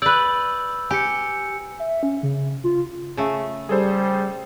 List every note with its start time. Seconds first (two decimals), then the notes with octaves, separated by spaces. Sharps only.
0.02 B4 D5 E6 G6
0.91 G4 G#5 C#7
1.79 E5
2.03 C#4
2.23 C#3
2.64 F4
3.17 C#3 A3
3.69 G3 G#4 A4 C5